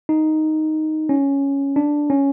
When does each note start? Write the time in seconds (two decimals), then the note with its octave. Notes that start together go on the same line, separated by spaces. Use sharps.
0.09 D#4
1.09 C#4
1.76 D4
2.10 C#4